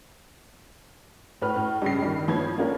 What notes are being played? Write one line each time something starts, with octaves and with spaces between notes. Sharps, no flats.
A2 B4 F6
A2
G2 C#3 C7
G2 D#3
F3 B3 C#4 B5 G#6
A#3 C#4 D4 F4 A#4